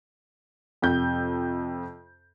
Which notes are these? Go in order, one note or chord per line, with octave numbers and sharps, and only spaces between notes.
F2 C3 G6